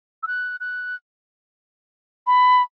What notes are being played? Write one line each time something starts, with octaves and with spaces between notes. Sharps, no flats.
E6
F#6
F#6
B5